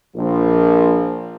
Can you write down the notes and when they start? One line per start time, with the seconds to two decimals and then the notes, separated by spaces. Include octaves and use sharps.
0.16 A#1 F3